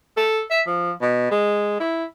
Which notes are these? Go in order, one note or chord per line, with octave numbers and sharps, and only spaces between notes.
A4
E5
F3
B2
G#3
E4